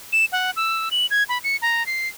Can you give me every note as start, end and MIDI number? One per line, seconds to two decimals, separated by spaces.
0.13 0.25 100
0.32 0.51 78
0.56 0.89 88
0.91 1.06 102
1.11 1.23 92
1.29 1.38 83
1.44 1.57 97
1.62 1.85 82
1.86 2.08 96